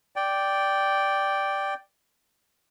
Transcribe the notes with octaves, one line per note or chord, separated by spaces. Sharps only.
D5 G5